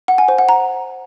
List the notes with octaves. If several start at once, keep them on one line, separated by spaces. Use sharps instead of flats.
F#5
G#5
C5
F#5
A#5